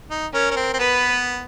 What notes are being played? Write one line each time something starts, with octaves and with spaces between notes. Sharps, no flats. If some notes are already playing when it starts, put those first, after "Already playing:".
D#4
C#4 A#4
C#4
C4
C4
B3 B4